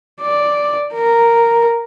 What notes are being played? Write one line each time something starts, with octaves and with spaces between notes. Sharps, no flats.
D5
A#4